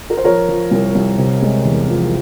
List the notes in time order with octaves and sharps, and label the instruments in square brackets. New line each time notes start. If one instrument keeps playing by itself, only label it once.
[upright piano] A#4
C5
F3 A#4 C#5
F3
C2
C2
C3
G#3
E2
F3